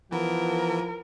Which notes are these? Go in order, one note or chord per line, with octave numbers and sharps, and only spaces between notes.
E3 F3 B3 A#4